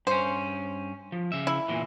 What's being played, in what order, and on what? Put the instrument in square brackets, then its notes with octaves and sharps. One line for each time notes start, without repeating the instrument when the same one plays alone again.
[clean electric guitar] G2 C#4 [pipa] C5
[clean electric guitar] F3
C#3 E5
[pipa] E4
[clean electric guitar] E2 A#2 E3